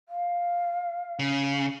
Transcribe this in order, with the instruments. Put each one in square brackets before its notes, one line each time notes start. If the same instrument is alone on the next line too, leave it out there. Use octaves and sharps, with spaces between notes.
[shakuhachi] F5
[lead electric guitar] C#3